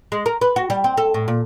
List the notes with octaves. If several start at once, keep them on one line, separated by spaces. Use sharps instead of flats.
G#3
A#4
B4
F#4
G3
C4
A4
A2
A#2